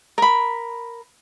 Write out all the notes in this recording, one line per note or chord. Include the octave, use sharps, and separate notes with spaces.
A#4 B5